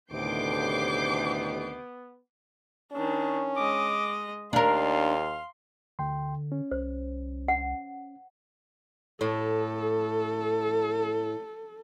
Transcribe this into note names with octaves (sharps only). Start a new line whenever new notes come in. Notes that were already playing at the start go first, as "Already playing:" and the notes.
D2 A2 C3 D#3 B3 D6 G6 C7
D#3 C#4 D4
G#3 D#5 D6
D#2 D4 A#4 F5 C6
D2 D3 G5 C6
C#4
C2 C5
F#5
A2 A4